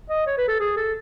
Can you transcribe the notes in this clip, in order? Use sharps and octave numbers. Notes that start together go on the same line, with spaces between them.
D#5
C#5
B4
A4
G#4
A4